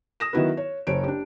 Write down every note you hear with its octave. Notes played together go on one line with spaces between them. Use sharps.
D#6 A#6 E7
D#3 F#3 B3 E4 F#4 B4
C#5
F#1 C5 C#5 D7
D4 G4